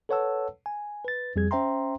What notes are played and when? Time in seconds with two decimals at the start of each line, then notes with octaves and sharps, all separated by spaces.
0.09 A4 B4 C#5 F#5 A5 E6
0.66 G#5
1.05 B4 A6
1.36 F2 G3 G#4 G#6
1.51 C#4 C5 E5 G5 A#5 C6